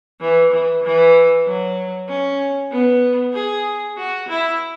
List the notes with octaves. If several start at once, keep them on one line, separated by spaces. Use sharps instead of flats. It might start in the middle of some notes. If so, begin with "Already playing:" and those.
E3
E3
E3
F#3
C#4
B3
G#4
F#4
E4